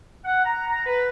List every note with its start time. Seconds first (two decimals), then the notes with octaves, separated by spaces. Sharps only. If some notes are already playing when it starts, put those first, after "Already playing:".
0.25 F#5
0.45 A#5
0.67 A#5
0.86 B4